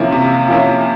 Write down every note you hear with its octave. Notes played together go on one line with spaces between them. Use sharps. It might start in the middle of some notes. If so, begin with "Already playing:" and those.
Already playing: C3 F3 A#3 C#4 E4
C3
F3 A#3 C#4 E4